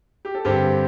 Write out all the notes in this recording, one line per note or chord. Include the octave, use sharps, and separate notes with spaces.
G4
A4
G2 D3 C4 G4 C5